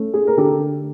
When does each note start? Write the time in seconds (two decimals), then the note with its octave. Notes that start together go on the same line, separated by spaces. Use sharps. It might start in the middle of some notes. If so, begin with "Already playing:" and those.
Already playing: A3 C#4
0.14 G#4
0.27 A#4
0.37 D3 G4 A4